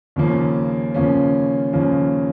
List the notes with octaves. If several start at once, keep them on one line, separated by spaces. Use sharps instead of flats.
D#2 C#3 F3 A#3 C#4
D#2 C#3 F3 A#3 C#4
D#2 C#3 F3 A#3 C#4